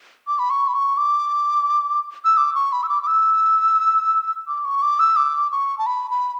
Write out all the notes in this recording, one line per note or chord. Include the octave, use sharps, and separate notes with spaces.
D6
B5
C#6
B5
C#6
D6
E6
D6
C#6
B5
E6
D6
D6
E6
D6
C#6
D6
E6
D6
C#6
A5
B5
B5